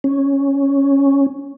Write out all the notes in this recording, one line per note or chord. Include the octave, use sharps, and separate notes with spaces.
C#4